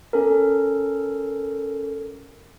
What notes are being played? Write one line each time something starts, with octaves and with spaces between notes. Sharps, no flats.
C#4 A4 A#4